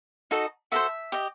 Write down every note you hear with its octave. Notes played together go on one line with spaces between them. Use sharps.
D#4 F#4 A4 D#5
F#4 A4 C5 E5
G4 D#5